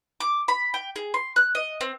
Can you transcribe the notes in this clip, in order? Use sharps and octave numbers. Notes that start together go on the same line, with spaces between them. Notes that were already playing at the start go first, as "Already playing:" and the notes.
D6
B5
G5
G#4
C6
F#6
D#5
C4